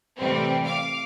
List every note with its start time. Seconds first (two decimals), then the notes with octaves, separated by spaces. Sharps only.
0.18 A2 C3 E3 G3 C4
0.64 F5 D6